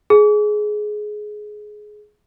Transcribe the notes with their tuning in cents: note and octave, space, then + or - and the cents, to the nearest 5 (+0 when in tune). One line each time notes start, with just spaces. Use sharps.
G#4 +15